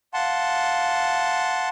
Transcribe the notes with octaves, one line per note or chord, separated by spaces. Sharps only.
F5 F#5 A5 C6